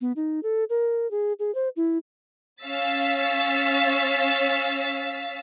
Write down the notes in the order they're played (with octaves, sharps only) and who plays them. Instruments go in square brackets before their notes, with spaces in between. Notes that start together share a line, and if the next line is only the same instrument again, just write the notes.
[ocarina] B3
D#4
A4
A#4
G#4
G#4
C5
E4
[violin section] C#4 C#5 F5 E6 A6 B6